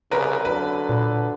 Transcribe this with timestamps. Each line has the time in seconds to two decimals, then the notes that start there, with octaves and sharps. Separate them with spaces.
0.11 C2 C#3 A#4 B4
0.45 D3 F#3 B4
0.89 A#2